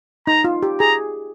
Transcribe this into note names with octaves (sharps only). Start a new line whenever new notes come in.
D#4 A#5
F4
G4
G#4 A#5